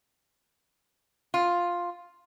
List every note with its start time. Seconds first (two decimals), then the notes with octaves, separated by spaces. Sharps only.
1.34 F4